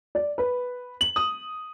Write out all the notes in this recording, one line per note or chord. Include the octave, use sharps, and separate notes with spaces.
D5
B4
F#7
D#6